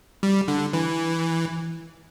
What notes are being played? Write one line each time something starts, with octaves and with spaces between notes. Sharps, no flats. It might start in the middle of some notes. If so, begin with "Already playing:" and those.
G3
D3
E3